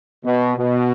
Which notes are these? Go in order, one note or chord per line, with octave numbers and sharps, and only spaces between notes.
B2
B2